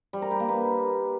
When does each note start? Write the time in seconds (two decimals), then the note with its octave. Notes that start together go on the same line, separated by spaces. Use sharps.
0.13 G3
0.22 A#4
0.31 G4
0.40 A#3
0.49 B4